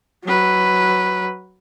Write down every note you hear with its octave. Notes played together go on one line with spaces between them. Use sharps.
F#3 B4